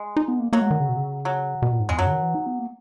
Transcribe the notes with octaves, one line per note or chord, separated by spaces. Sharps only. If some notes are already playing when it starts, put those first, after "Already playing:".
Already playing: G#3
D#4
B3
A#3
F#3 A#3
G#3
D#3
C#3
B2
C#3
F#3
B2
A#2
G#2
E2 G#3
F#2 F#3
C#3
D#3
E3
D#4
B3
A#3